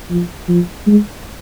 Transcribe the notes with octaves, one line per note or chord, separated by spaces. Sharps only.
F3
F3
G#3